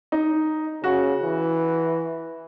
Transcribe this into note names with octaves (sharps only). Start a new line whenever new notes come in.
D#4
C#3 F#4
E3